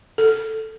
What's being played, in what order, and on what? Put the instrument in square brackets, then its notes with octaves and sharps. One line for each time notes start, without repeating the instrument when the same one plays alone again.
[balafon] A4